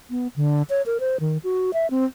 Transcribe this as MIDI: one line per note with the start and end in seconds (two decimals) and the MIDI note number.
0.10 0.28 59
0.36 0.62 50
0.70 0.82 73
0.86 0.98 70
1.00 1.17 72
1.20 1.38 51
1.44 1.71 66
1.74 1.90 76
1.90 2.05 60